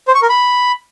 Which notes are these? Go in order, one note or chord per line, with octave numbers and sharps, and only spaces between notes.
C5
C#6
A#4
B5